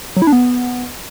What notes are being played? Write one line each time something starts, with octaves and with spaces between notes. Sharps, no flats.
F#3
E4
D4
B3